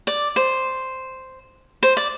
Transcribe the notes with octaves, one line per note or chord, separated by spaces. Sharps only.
D5
C5
C5
D5